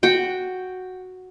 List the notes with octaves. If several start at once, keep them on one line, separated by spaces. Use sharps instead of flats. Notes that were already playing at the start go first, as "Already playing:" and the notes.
F#4 F#5 G5